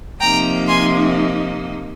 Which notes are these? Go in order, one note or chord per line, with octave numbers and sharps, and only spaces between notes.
C3 F3 A#3 D#4 G5 A#5
G#5 C6